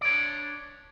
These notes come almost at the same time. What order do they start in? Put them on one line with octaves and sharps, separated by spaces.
D5 C#5 D4